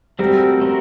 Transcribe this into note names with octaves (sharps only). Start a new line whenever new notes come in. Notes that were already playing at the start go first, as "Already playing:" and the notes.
G3 A3 C4 F#4 A#4
A3 C4 F#4 A#4